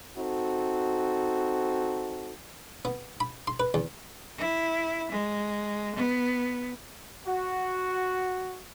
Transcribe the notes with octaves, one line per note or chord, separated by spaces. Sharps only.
C4 D#4 F#4 A4
B3
B5
C6
B4
E2
E4
G#3
B3
F#4